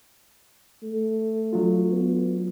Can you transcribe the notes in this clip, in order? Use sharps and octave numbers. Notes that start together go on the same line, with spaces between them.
A3
F#3 D4 F4
B3